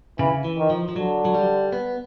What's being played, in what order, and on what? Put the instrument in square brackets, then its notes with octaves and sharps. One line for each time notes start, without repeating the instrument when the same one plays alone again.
[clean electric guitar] C#3 [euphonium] E3
[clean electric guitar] E3
[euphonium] D#3
[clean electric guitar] F3
F3
[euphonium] D3 [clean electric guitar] F#3
[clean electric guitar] F#3
G3
B3